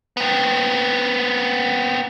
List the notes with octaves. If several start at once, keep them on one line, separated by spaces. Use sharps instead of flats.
B3 C4